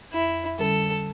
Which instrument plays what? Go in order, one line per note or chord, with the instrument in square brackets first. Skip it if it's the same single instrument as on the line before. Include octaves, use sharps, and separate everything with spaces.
[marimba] F2 [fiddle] E4
[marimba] D3 G3 C#4 [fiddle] A4